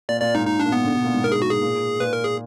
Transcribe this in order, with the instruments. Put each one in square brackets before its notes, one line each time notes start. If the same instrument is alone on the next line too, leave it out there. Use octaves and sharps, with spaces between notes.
[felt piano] A#2 [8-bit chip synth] D5
[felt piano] A#2 [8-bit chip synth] D5
[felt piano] G#2 [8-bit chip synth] D#4
[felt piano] A#2 [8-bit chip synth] D#4
[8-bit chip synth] D4
[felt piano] A#2
[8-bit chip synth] B3
[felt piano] D3
B2
A#2
G#2
[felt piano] A#2 [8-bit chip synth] A#4
[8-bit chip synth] G#4
F#4
G#4
[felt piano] A#2
[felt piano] A#2 [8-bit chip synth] B4
[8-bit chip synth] A#4
G#4